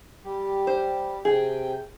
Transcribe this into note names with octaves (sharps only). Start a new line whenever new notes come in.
G3 G4
C5
C3 G#4 G5